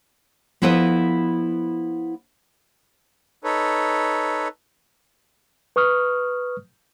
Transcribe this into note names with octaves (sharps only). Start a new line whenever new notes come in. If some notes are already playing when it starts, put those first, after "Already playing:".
F3 B3 E4 A4 B4 D#5
D#4 A4 B4 C#5
B4 C#6 D#6 F6